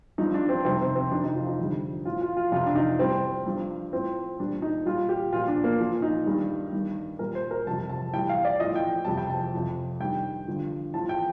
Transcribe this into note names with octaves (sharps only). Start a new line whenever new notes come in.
G2 F3 D#4
D4
C4
F2 C3 D#3 G3 C4
C4
C4
F2 C3 D#3 D4
D#4
F4
D#4
F2 D3 G3
A2 F3 F4
F4
F4
F2 C3 F3 F4
D4
D#4
A2 G3 C4
G2 F3
A2 F3 C4
A#2 G3 D4
D#4
A#2 G3 F4
G4
A#2 F3 F4
D4
A#3
A#2 F3
D#4
G2 D#3 G3
G2 D#3 G3
A#2 G3 A#4
C5
A#4
F2 C3 G3 A5
A5
A2 G3 G5
F5
D5
A2 F3 D#5
G5
F2 C3 G3 A5
G5
A5
F2 C3 F3
G2 D#3 G3 G5
G2 D3 F3
A2 F3 A5
G5